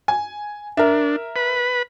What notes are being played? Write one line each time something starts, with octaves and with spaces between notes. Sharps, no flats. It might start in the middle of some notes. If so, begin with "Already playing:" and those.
G#5
D4 A#4 E5
B4 B5